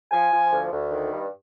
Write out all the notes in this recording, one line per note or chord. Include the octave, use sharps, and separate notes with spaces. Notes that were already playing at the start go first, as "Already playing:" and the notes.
F3 G#5
F3
D2
D2
D#3
G2